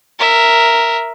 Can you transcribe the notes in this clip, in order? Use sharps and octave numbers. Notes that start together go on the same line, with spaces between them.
A#4 E5